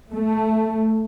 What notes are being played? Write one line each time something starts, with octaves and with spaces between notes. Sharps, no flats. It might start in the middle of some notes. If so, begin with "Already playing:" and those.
A3